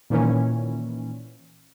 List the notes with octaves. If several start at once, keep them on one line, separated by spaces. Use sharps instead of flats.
A#2 D#3 E3 C#4